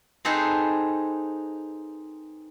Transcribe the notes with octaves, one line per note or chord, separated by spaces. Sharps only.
C4 D#4 G#4 A4 B4 C5